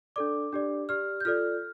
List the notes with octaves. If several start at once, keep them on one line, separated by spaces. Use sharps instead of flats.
D4 A4 D5 D6
D4 G4 D5
G4 D5 F6
G6
F4 A4 D5 F6